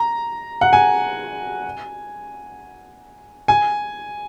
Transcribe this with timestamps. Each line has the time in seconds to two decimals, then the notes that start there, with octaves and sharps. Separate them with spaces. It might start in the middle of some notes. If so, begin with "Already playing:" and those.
Already playing: A#5
0.61 F#5
0.73 G#5
3.48 G#5